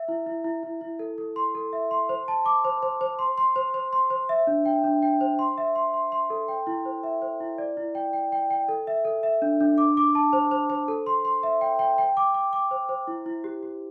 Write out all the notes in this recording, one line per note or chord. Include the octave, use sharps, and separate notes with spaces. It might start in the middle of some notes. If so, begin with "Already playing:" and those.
Already playing: E5
E4
E4
E4
E4
E4
A4
A4
C6
A4
E5
C6
C5
A5
D6
C5
C5
C5
C6
C6
C5
C5
C6
C5
E5
D4
G5
D4
G5
C5
C6
E5
C6
C6
C6
A4
G5
E4
C5
E5
C5
E4
D5
E4
G5
G5
G5
G5
A4
E5
A4
E5
D4
D4
D6
D6
A5
C5
C5
C5
A4
C6
C6
E5
G5
G5
G5
D6
D6
D6
C5
C5
E4
E4
G4
G4